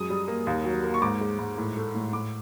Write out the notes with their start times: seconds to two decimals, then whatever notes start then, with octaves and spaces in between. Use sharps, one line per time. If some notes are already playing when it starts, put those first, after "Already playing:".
Already playing: F#2 G#3 D#6
0.10 G3
0.28 A#3
0.47 D#2
0.64 F#3
0.84 A#3
0.94 C#6
1.02 G#2 D6
1.21 G#3
1.39 G#2
1.57 A2
1.77 A3
1.95 A2
2.13 A2 D6